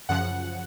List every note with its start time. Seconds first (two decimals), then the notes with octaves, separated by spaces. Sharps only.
0.09 F#2 C#3 F3 F#5